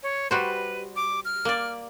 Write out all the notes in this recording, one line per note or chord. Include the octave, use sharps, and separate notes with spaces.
C#5
G3 F#4 B4 C5
D6
F6
A#3 D5